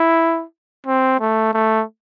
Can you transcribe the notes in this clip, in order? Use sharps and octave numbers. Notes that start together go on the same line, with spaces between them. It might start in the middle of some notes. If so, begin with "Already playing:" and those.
Already playing: E4
C4
A3
A3